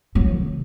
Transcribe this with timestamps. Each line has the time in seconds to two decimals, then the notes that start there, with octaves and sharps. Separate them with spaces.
0.15 F#3
0.36 C3